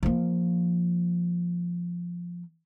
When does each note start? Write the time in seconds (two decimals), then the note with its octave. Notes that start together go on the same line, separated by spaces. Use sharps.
0.03 F3 A#3